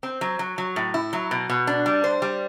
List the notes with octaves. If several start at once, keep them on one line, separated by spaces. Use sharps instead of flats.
C4
F#3
F#3
F#3
A2
E4
F#3
B2
B2
D4
G3
C5
G3